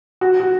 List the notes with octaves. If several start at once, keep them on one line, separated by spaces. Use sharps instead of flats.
F#4
F#4